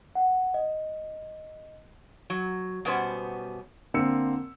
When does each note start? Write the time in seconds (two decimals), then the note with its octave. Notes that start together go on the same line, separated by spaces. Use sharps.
0.15 F#5
0.54 D#5
2.30 F#3
2.85 B2 G3 B3 C#4 C5
3.94 D3 A#3 C4 E6 C#7